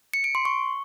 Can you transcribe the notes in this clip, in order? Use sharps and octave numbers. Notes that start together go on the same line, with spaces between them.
C#7
D7
C6
C#6